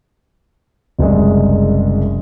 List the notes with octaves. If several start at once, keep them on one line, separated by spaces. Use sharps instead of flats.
F#1 C2 G#3